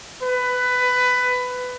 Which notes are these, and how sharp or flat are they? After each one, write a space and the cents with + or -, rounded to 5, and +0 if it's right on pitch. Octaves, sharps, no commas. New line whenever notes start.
B4 +15